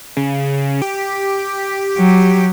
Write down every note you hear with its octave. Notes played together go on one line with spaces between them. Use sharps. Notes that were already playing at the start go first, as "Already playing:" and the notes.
C#3
G4
F#3